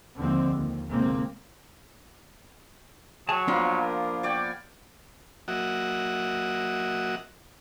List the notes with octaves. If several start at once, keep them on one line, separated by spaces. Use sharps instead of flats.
D#2 D3 F3 G#3 C4
D#2
G1 G#2 C3 G#3 A#3 C4
F#3 G#4 A5
F3 A#3 B3 D4 C6
A#4
C#5 D5 G5
F#3 A#3 F#4 D#5 E5 F#5